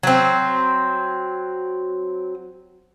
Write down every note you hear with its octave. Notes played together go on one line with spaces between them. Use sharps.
F#3 C4